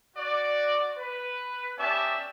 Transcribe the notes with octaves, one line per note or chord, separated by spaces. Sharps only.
F#4 D5
B4
B3 C#4 G4 D5 E5 A5